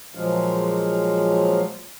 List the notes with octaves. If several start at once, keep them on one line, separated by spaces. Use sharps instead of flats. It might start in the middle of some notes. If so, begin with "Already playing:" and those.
A#2 F3 F#3 G#3 F5